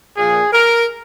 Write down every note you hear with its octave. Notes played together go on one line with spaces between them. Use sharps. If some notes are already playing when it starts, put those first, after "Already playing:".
A#2 F3 G#4
A#4